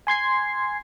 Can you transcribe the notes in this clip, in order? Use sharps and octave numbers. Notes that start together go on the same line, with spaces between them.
G#5 C6 G#6 C7